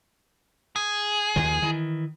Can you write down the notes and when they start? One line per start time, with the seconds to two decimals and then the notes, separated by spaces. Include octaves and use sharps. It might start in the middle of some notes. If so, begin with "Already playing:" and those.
0.76 G#4
1.36 D#2 D#3 F3
1.62 D#3 E3